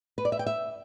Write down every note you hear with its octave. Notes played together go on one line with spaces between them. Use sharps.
B4
D5
E5
G5
E5